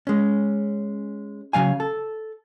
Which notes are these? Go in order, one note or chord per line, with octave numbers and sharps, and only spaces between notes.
G#3 C#4
C#3 F#3 F5 G#5
A4